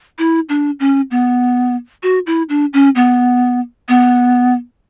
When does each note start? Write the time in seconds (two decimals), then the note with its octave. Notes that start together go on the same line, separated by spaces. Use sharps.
0.18 E4
0.49 D4
0.80 C#4
1.11 B3
2.03 F#4
2.27 E4
2.49 D4
2.73 C#4
2.95 B3
3.89 B3